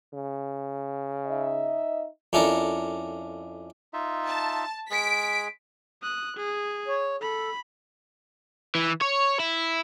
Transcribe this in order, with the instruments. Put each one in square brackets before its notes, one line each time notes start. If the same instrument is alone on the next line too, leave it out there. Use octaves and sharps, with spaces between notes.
[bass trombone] C#3
[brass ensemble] D#4 D#5 E5
[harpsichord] F2 C#4 D4 E4 A4 A#4
[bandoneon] D#4 F4 E5
[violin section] A5
[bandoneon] G#3 G#4 [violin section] B6 D7
[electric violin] D#6 F#6
G#4
[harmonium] C#5
[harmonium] A4 [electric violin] B5
[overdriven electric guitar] E3
C#5
E4